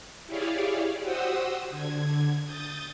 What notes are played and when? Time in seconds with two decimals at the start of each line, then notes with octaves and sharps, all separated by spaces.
0.26 E4 G4 G#4 C#5 D5 F5
1.01 F#4 G4 C5 F#5 D#6 E6
1.70 D3 G#6
2.45 D#6 G6 A6